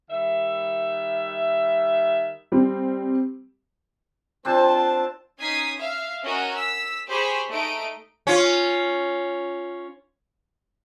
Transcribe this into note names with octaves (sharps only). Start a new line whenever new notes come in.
D#3 G3 E5
G3 C4
C4 D4 F4 C5 A5
C#4 D#4 D#6 G#6 B6 C7
E5 F5
C#4 F#4 A#4 C#5 D#5
E6 B6
G4 G#4 C5 B5 C#6
A3 D#4 D#5 D7
C#4 F4